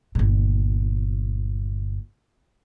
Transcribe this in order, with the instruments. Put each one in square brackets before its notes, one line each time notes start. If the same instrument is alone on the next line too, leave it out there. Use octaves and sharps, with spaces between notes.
[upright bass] G1 A#2